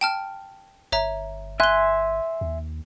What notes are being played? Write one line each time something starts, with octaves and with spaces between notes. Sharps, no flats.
G5 A5 F6
G1 C#5 E5 A#5
E5 G#5 C6 F#6 G7
D#2